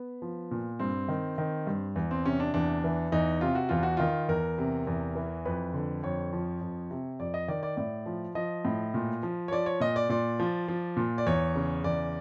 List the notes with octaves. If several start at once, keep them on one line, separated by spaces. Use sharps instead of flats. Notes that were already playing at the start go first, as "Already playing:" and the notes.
Already playing: B3
F3
A#2
G2 C4
D#3
D#3
G2
E2
C4
C3 C#4
D4
E2 D4
E3
E2 D#4
C3 F4
F#4
E2 F4
F#4
D#3 F4
E2 A#4
C3
E2
E3
F2 B4
D3
F2 C#5
F3
F2
C3
F2 D5
D#5
D#3 D5
D5
A2 D5
F3
F3 D#5
A2
A#2
F3
C#5
F3 D5
C#5
A#2 D#5
D5
A#2 D5
F3
F3
A#2
D5
E2 C#5
C#3
E2 D5